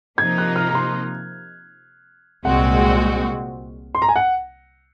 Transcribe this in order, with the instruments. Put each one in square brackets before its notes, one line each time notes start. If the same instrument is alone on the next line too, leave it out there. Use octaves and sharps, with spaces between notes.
[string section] C3 F3 A#3 D#4 [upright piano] G#6
[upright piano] F#6
F6
A#5
C6
[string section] C2 A#2 G#3 C4 F#4 [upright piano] F#5
[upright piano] C6
A#5
G#5
F#5